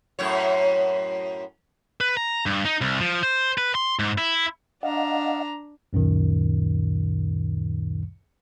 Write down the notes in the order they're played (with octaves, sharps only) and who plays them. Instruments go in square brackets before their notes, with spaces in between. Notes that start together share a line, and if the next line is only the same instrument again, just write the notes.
[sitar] F#2 A2 C#5
[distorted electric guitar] B4
A#5
G2
D#4
C2
F3
C5
B4
C6
G#2
E4
[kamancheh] D4 A#5 [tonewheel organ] D#5 F5 F#5
[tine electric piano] C#2 F#2 A#2 D#3